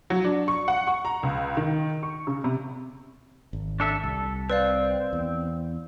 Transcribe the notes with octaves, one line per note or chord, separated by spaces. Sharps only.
F#3
D4
C#6
F#5
C#6
A#5
C#2
D#3
C#6
C#3
C3
G#1
D4 A4 E5
C2 A4
C4 B4 D5 F5
E2